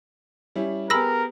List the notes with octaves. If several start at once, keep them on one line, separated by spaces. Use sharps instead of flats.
G3 C#4 E4
B3 G4 G#4 A#4 B5 E6 A#6